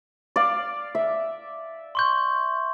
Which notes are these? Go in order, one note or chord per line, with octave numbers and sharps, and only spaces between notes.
D5 F5
E5
C6 C#6 G6